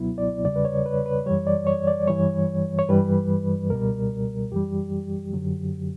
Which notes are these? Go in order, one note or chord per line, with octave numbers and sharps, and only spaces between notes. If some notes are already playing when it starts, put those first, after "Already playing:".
Already playing: C#2 B2 F#3 B3 E4
D5
E2 C#3 G3 D5
B4
C#5
B4
B4
F#2 E3 G3 C#5
D5
C#5
D5
G2 E3 G3 C#5
C#5
G2 E3 G3 B4
C#2 B2 G3 A#4
F#2 E3 G3 G4
F#2 D3 F#3